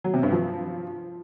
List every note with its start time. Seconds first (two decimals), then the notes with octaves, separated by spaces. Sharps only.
0.04 F#3
0.14 C3
0.23 G2
0.32 F3